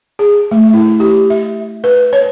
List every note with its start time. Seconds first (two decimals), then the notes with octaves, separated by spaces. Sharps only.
0.19 G#4
0.51 A3
0.74 E4
1.00 G4
1.30 E5
1.84 B4
2.13 C#5